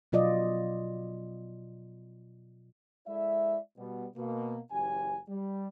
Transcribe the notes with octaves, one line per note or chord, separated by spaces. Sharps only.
B2 F#3 F4 D5 D#5
G#3 E4 A4 D5 E5
B2 G3 B3
B2 A#3
F#1 E3 C#4 G4 G#5
G3